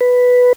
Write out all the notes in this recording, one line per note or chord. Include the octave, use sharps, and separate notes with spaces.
B4